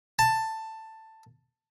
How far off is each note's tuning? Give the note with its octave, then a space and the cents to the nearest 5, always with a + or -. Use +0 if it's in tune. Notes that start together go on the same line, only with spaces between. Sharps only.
A5 +10